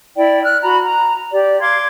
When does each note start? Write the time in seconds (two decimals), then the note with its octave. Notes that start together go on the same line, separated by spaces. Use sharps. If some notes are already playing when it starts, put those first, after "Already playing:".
0.17 E4 D5 G5
0.43 F6 F#6
0.62 F#4 A#5 B5
0.84 A#5
1.31 G4 D5
1.60 F5 C6 D6 G#6